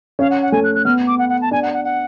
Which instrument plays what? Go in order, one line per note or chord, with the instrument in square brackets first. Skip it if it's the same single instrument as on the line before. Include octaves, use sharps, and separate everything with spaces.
[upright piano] C#4 [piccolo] F5
[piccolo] F#5
F#5
[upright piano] A3 [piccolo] G#5
[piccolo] F#6
F#6
[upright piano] B3 [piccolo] F6
[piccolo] D6
F#5
F#5
A5
[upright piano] D4 [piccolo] G#5
[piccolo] F#5
F#5
F#5